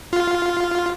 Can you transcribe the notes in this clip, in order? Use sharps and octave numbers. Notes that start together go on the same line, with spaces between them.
F4